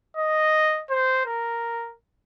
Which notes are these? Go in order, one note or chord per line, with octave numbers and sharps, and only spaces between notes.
D#5
C5
A#4